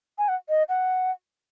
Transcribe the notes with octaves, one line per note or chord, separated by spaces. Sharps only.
G#5
F#5
D#5
F#5